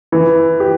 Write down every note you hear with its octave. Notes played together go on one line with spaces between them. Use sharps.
E3
G4